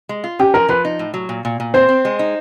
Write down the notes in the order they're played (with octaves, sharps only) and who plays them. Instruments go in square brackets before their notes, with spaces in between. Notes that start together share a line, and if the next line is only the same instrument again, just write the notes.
[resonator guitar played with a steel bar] G#3
F4
[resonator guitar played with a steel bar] C#4 [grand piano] G4
[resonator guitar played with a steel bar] F3 [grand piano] A#4
[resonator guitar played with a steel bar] F3 [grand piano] B4
[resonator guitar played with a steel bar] D#4
A2
F#3
A#2
A#2
A#2
[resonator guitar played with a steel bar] C4 [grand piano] C5
[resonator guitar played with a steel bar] C4
G#3
D#4